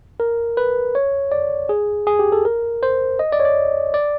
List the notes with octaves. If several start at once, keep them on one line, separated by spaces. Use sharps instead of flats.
A#4
B4
C#5
D5
G#4
G#4
G4
A4
A#4
C5
D#5
D5
C#5
D5
D5